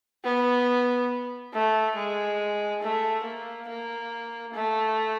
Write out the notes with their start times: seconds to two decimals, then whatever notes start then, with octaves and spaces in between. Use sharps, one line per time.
0.25 B3
1.53 A3
1.96 G#3
2.82 A3
3.25 A#3
3.68 A#3
4.54 A3